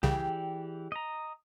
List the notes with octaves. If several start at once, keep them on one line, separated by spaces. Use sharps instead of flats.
C2 C#3 E3 G4 G#4 D5 G5
D#5 A#5